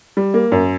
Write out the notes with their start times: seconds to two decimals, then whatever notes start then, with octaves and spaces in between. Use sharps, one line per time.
0.17 G3
0.34 A#3
0.52 F#2